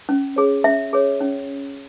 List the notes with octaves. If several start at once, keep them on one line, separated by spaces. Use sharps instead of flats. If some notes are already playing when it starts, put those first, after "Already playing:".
C#4
G#4 C#5
C#4 E5
G#4 C#5
C#4